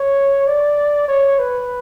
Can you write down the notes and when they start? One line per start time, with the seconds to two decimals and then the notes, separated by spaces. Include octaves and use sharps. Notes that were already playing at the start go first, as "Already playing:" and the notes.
Already playing: C#5
0.47 D5
1.08 C#5
1.39 B4